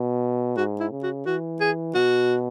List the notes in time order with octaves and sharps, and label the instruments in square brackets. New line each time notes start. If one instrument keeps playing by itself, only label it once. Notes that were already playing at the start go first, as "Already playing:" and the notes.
Already playing: [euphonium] B2
[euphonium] G#2 [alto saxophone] F#4
[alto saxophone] E4
[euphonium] C#3
[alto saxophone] F#4
[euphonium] E3 [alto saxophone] F#4
[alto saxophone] G#4
[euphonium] B2 [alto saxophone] F#4